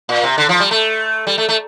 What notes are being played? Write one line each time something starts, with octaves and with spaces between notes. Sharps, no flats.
A#2
C3
D3
F3
G3
A3
G3
A3
A3